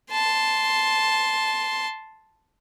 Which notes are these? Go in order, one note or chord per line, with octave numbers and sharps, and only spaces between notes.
A5 C6